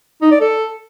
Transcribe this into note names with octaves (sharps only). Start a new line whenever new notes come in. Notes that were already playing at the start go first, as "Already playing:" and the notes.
D#4
D5
A4